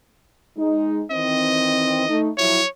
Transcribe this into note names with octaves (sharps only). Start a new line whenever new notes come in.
G#3 D#4
D#3 E3 C4 D#5
A3 D#4
F3 F#3 E4 C#5